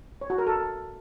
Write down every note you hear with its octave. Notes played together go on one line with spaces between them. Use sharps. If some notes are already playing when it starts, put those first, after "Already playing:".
C#5
F#4
A#4
A4